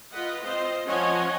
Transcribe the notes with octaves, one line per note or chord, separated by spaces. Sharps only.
F4 B4 D#5 F#5
C4 F4 C5 D#5
F3 C#4 C#5 D#5 F#5 G#5